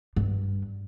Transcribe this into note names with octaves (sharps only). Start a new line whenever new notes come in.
G2